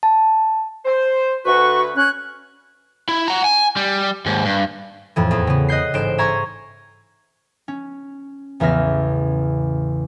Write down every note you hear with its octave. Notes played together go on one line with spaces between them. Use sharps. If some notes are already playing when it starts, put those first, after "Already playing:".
A5
C5
D2 F#4 B4 C#6
C#4 F#6 G#6
E4
F#5 A#5
G#5
G3
D#2 G#2
G2
F2 A2 E3
E2
C#3 B3
D#5 F#6 G6 C7
A1 G#2 C5 D7 E7
E5 G#5 A#5 C6 C#6 G#6
C#4
A1 E2 C#3 E5 F6 A#6